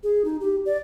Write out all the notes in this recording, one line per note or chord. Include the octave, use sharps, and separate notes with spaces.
G#4
D#4
G4
D5